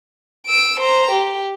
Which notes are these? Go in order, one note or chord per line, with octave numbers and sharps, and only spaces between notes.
E6 D7
C5 A#5
G4